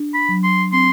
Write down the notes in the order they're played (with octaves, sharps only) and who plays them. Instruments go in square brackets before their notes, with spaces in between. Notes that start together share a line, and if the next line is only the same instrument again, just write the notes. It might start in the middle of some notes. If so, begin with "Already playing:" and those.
Already playing: [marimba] D4
[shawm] B5
[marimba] F#3
[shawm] C6
[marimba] C4 [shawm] C6